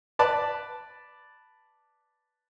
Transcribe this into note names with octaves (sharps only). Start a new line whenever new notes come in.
B4 D5 A5 B5